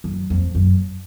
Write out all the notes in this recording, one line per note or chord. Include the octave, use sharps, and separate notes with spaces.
F#2
F2
F#2